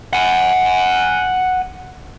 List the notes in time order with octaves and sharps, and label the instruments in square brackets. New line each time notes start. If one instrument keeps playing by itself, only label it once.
[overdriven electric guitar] F#5 G#5